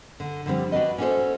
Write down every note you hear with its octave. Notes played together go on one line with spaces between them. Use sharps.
D3
D3 F3 G3 C4
D4 F#4 B4 D#5
C#4 D4 F#4 G4 A4 C5